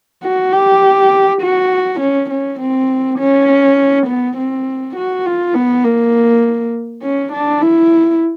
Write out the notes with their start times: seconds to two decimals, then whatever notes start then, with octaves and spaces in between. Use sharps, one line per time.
0.23 F#4
0.53 G4
1.42 F#4
2.00 C#4
2.30 C#4
2.60 C4
3.19 C#4
4.07 B3
4.37 C4
4.96 F#4
5.26 F4
5.54 B3
5.84 A#3
7.03 C#4
7.33 D4
7.62 E4